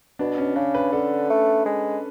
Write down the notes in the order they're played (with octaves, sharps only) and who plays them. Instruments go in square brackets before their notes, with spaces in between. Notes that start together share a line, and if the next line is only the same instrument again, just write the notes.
[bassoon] B2 [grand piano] D4
[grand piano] C#4
[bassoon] C#3 [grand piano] D4
[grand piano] B4
[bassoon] D3 [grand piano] A4
[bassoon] A3
G#3